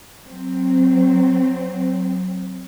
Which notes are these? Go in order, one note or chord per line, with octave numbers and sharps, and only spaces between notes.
F#3 C4